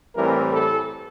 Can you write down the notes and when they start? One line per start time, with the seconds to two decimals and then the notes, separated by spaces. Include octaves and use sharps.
0.15 A2 E3 G3 C4 A#4
0.53 A4